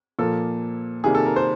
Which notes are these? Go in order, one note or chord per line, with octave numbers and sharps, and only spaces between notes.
A#2 F3 A#3 A4
C3 D#3 G3 A#3 G#4
A4
A#4
C5